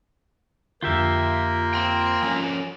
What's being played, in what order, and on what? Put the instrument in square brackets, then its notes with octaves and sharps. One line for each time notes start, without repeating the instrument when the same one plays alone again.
[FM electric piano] F2 D3 [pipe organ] A#3 [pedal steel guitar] F4 G4 E5
[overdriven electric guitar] G5 C6
[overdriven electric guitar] F3 C#4 [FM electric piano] G#5